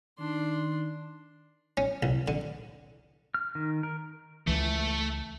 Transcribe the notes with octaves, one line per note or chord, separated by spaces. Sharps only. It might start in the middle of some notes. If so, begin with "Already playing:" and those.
D#3 D4 C6
C#4
C2
D3
F6
D#3
A#4
C#2 E3 A3